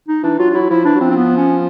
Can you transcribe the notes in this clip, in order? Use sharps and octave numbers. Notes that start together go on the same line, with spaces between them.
D#4
E3 D4
F#3 F4
F4
F#3 E4
F3 E4
E3 D4
F#3
F3 C4
C4
B3
C#4